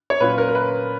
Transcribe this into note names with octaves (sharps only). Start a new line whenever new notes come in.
C#5
A#2 F#3 C#4 F4 B4
A#4
A#4
B4